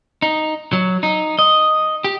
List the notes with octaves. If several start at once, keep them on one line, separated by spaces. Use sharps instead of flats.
D#4
F#3
D#4
D#5
G4